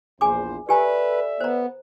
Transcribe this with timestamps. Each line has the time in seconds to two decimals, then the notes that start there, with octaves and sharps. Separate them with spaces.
0.21 A#1 E2 G#4 C5 G#5 D6
0.69 G4 A4 B4 D5 E5 G#5 A#5
1.40 B3 C5 A#5